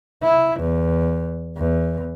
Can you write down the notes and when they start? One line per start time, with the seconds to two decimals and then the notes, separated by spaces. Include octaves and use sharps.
0.23 E4
0.60 E2
1.57 E2